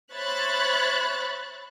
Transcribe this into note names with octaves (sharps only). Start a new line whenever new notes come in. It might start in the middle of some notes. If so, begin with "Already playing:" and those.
C5 C#5 E5 B5 F#6 A6